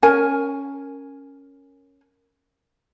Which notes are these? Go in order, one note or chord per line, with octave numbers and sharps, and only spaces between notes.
C#4 A#4 G#5